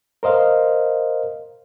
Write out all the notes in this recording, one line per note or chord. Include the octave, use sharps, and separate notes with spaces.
A#4 C5 D#5 F5